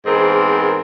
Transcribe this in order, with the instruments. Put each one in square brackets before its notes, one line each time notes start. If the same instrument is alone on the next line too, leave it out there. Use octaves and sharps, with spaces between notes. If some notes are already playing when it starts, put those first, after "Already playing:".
[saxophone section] E2 G#2 C4 G#4 A#4